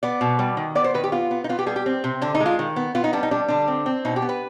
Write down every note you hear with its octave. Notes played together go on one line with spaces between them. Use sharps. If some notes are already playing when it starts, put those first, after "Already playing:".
B3 D5
B2
G3
D#3
B3 D5
C5
D#3 B4
G4
B3 F4
B3
D#4
B3 F4
G4
G3 G#4
G4
C4
C3
D3 D4
D#4
G#3
F4
D#3
B3
B3 F4
D#4
G3 D4
D#4
G3 D4
D3 D4
C4
C4
B2 D#4
G4
B3
B4